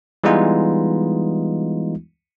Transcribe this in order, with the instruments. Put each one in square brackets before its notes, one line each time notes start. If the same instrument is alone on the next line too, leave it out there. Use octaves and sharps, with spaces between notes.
[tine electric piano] E3 G3 G#3 B3 D#4 F4